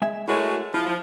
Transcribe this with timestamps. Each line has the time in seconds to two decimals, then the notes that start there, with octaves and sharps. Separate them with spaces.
0.02 G#3 E5 G#5
0.28 G#3 A3 E4 F#4 A#4 C#5
0.74 F3 E4 F4
0.86 F3